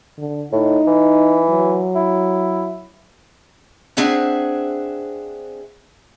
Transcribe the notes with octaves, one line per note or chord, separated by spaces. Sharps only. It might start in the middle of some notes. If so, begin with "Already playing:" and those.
D3
A2 D#4
E3
F#3
E4
C4 D4 G#4 C5 E5 F#5